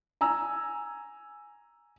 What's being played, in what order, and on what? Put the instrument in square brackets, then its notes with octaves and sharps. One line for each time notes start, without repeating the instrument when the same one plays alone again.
[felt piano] G#5 A#5 E6